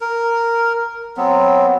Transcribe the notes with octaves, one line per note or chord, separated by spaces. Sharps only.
A#4
F#3 B3 C4